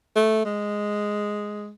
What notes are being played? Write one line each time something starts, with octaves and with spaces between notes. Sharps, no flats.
A3
G#3